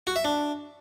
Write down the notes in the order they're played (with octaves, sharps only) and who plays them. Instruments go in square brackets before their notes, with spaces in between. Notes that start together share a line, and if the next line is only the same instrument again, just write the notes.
[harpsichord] F#4
E5
D4